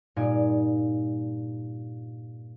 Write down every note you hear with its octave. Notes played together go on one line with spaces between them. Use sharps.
G2 A#2 D#4 G#5 D7